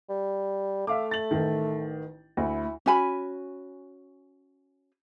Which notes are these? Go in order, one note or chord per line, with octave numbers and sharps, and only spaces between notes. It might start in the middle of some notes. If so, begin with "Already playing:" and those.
G3
A3 E5 F5 D6
A6 F#7
A1 D#3
D2 E4
C#4 F#4 G#5 B5